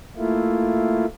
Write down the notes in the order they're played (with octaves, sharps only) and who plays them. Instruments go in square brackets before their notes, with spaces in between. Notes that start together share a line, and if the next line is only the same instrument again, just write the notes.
[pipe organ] A3 A#3 E4 F4